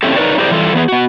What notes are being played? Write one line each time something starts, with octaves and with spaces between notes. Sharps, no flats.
C4 C#4 E4 G4 A4
D#4 A#4 B4 C#5 D5
E4 G4 G#4 A#4 C5 D5
E3 G3 F4 A4
E3 B3 G#4
B3 F#4